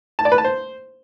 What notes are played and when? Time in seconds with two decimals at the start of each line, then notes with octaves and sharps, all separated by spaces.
0.19 A5
0.25 D5
0.32 B4
0.38 A5
0.44 C5